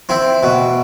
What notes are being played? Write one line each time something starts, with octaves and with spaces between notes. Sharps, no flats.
C4 E4
B2